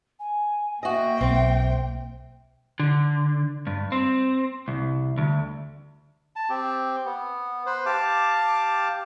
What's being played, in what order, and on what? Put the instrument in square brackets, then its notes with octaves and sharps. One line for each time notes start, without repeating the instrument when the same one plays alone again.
[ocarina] G#5
[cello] A#3 G5 [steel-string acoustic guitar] F#4 D#5 [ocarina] E5
[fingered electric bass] B1 [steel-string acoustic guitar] C4
[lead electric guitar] D3
G2
C4
C2
D2
[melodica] A5
C4 G4
B3
B4 C5
G4 F5 A5 D6